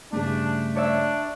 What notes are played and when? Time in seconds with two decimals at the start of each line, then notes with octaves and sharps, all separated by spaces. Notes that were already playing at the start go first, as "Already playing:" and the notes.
0.13 G2 C#3 A3 D4
0.76 D4 C#5 D5 E5